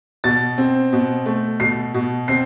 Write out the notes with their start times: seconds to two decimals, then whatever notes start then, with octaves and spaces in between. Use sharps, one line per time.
0.24 B2 A6
0.58 C4
0.93 B2
1.26 A3
1.60 B2 C7
1.94 B2
2.28 C4 C7